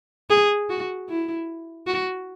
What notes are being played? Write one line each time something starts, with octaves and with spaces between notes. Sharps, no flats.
G#4
F#4
E4
F#4